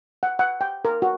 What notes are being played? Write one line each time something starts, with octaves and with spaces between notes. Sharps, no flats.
F#5
F#5
G5
A#4
F#4